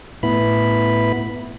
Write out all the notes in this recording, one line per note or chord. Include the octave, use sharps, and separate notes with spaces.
A2 B3 E4 B5